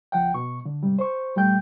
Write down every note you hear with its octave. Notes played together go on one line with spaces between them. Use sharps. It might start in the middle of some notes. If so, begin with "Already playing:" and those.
C#2 F3 F#5 G5
B2 C#6
D3
G#2 C3 G3
C5 C#6
A#2 G3 A3 G5 G6